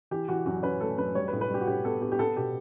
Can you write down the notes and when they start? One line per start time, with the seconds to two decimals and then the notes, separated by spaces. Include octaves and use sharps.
0.11 E3 G4
0.29 E3 F#4
0.46 F#2 F#4
0.63 C#4 B4
0.81 A3 A4
0.98 F#2 B4
1.15 G3 C#5
1.28 B4
1.33 A2
1.41 B4
1.50 G3 G4
1.61 F#4
1.67 A2 G4
1.84 B3 A4
2.01 B3 G4
2.12 G4
2.19 B3 A4
2.36 B2 G4